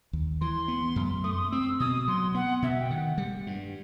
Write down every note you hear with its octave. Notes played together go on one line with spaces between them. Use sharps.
D#2
E3 C6
B3
F#2
A3 D#6
C6
D#6
C4 E6
B2 D#6
F#3 C6
B3 F#5
B2 E5
G5
D#3 F#5
G3
G2